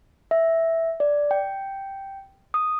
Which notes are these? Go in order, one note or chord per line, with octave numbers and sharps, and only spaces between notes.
E5
D5
G5
D#6